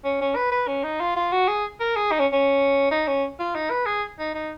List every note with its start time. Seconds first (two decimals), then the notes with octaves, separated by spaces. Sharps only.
0.04 C#4
0.21 C#4
0.36 B4
0.52 B4
0.68 C#4
0.84 D#4
1.01 F4
1.17 F4
1.32 F#4
1.48 G#4
1.80 A#4
1.96 G#4
2.12 D#4
2.19 C#4
2.33 C#4
2.91 D#4
3.08 C#4
3.40 F4
3.55 D#4
3.71 B4
3.86 G#4
4.19 D#4
4.35 D#4